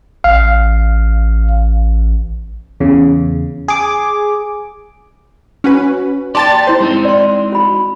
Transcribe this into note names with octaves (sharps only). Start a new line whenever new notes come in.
A1 F5
E2 C#3
G#4 D6
C#4 F#4 B4
D#4 G4 D5 A5 C6 A6
E4 C5 C6
G#3 C4 D#4
D5 C6
F#4 B5